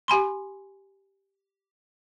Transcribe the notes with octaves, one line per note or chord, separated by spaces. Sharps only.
G4 G#5 B5 C6